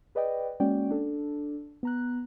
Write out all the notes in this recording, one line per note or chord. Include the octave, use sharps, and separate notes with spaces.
G#4 B4 D5 D#5 G5
G#3 A#3 C#4 F#4 D5 G5
D4 A4
B3 A#5 F#6